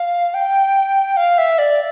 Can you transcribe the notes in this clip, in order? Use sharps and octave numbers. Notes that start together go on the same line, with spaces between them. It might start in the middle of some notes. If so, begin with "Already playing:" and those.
Already playing: F5
G5
F5
E5
D5